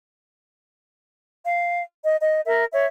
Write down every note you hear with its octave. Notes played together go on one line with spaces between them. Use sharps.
F5
D#5
D#5
A#4 E5
C#5 E5